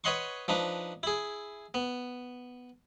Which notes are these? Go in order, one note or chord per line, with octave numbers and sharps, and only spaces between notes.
B4 C#5 D#5 F#5 C6 C#6
F3 D4 D#4 B4
E4 G#4
B3